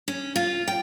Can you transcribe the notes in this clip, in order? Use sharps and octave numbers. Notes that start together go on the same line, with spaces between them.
C#4
F4
G5